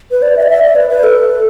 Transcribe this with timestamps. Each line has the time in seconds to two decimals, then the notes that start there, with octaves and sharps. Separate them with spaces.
0.11 B4
0.22 D5
0.36 E5
0.43 D5
0.50 E5
0.62 D5
0.76 B4
0.89 B4
1.03 A4